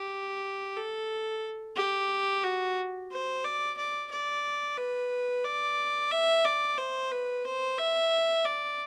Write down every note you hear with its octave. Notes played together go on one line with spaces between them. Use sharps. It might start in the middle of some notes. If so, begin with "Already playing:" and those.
Already playing: G4
A4
G4
F#4
C5
D5
D5
D5
B4
D5
E5
D5
C5
B4
C5
E5
D5